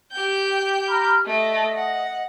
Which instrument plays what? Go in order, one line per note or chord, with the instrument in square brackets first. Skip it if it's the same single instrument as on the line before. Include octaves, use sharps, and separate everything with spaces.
[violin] G4 G6 [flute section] G5
[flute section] A#5 B5 F6
[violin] A3 [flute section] D#5
[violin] F#5